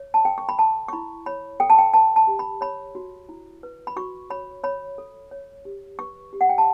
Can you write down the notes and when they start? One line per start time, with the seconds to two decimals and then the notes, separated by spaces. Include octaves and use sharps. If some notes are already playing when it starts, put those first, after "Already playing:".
Already playing: C#5
0.14 A5
0.25 A4 G5
0.38 C#6
0.49 B5
0.59 A4 A5
0.88 C#6
0.93 E4 B5
1.26 C#5 B5
1.60 A4 G5
1.70 A5
1.78 G5
1.94 B4 A5
2.16 A5
2.27 G4
2.39 B5
2.61 C#5 B5
2.95 F#4
3.29 E4
3.63 B4
3.87 B5
3.96 F#4 C#6
4.30 C#5 B5
4.63 C#5 B5
4.98 A4
5.31 C#5
5.65 G4
5.99 B4 C#6
6.33 G4
6.41 F#5
6.49 G5
6.58 A5